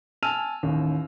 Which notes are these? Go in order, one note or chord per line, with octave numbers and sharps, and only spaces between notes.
G#5 A5 E6 F6 D#7 F7
A1 D#2